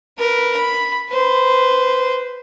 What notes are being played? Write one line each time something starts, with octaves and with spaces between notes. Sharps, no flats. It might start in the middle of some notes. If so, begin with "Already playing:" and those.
A#4 B4
B5
B4 C5